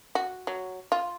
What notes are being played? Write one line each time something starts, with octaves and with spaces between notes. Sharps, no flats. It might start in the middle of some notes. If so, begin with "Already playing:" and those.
F#4
F#3
F4